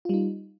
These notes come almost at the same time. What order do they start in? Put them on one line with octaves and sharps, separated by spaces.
F4 G3 D#4